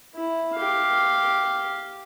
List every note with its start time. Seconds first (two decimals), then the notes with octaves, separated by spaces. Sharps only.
0.15 E4
0.56 G4 F5